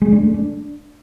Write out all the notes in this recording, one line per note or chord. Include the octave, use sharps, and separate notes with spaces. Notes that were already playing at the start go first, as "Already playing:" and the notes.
G#3
D4
A3
D4